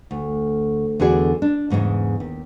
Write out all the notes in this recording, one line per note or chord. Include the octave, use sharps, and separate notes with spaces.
D2
E2 D3 F#4 G#4 D5
D4
E2 G#2 C#3 G#3
D#2